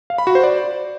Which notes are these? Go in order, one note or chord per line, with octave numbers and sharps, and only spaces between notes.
F5
B5
F#4
C5
D5